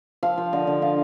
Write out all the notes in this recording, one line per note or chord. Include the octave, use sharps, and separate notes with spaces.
F3 F5
F3
D3 D#5
D3
F4 F5